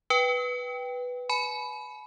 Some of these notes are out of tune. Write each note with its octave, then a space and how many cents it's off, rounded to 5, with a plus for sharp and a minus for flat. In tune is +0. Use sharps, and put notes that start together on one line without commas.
B4 +0 G5 +0
G#5 +40 B5 +0